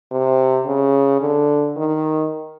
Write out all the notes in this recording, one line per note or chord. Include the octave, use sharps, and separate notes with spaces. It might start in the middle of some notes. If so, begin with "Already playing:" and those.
C3
C#3
D3
D#3